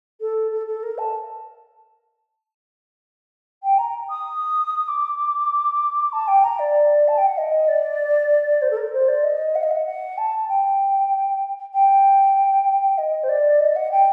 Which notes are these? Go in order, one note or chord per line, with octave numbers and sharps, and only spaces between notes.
A4
A4
A4
A#4
A5
G5
A#5
D#6
D6
A5
G5
A#5
D5
A5
G5
F#5
D#5
D5
C5
A4
A#4
C5
D5
D#5
F#5
D#5
F#5
F#5
A5
G5
G5
D#5
C5
D5
D#5
F#5
G5